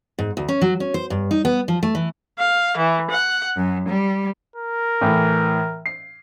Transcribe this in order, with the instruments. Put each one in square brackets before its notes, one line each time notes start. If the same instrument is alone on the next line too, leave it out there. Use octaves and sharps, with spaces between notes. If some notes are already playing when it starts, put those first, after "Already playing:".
[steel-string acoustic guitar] G#2
D2
C#4
F#3
C#4
C5
G2
D#4
B3
F3
A3
E3
[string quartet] F5
E3
F#5
F#2
G3
[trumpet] A#4
[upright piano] A2 E3
C7